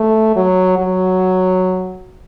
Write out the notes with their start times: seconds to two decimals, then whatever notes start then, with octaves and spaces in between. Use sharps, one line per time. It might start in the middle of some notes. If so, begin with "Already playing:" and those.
Already playing: A3
0.36 F#3
0.79 F#3